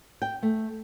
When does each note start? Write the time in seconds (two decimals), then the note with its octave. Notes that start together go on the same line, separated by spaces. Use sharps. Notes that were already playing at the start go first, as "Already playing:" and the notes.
0.22 G5
0.43 A3